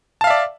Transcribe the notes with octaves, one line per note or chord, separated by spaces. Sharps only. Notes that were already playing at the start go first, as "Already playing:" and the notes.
D5 E5 F5 A5